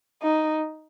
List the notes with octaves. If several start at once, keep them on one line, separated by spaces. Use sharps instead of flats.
D#4